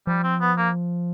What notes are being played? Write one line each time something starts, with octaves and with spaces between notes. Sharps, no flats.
F3 G3
C4
B3
A#3